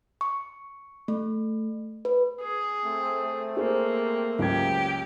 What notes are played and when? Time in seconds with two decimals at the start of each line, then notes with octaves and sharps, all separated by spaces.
0.21 C#6
1.08 A3
2.05 B4
2.42 G#4
2.85 A3 C4
3.57 A#3 G#4 C5
4.39 C#2 F#2 G4 G#6